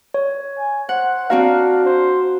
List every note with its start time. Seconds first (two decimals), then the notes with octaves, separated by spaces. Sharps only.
0.14 C#5
0.58 G#5
0.89 C5 F#5
1.30 C4 D4 F#4 A#4 F5
1.85 C5